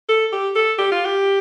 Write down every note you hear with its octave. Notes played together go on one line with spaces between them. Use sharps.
A4
G4
A4
G4
F4
G4